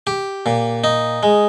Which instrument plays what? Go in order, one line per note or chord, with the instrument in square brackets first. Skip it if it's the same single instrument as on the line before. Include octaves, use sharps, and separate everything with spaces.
[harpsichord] G4
A#2
D#4
G#3